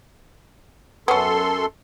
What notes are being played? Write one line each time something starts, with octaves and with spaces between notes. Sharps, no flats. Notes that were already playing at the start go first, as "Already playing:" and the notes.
F#2 B3 C#4 A4 C6